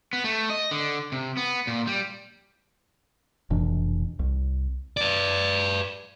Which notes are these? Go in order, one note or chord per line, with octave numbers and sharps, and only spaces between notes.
B3
A3
D#5
D3
C3
B3
A#2
G3
F1 B2 E3 D4
C2
B4 D5